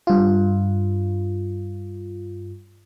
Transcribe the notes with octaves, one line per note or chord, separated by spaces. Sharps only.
G2 F4